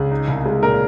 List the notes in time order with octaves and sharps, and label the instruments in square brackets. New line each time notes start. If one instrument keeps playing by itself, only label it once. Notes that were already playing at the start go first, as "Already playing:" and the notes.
Already playing: [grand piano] C#2 [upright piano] G#4
[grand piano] D#4
C2
G#3
[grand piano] A#2 [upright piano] A#4